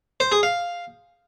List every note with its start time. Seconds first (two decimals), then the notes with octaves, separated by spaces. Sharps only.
0.20 C5
0.32 G#4
0.43 F5